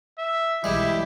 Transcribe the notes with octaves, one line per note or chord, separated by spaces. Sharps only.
E5
B1 E3 G3 G#3 E4 G4